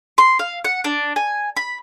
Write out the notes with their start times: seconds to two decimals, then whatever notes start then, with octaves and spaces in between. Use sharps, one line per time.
0.18 C6
0.39 F5
0.65 F#5
0.84 D4
1.16 G#5
1.57 B5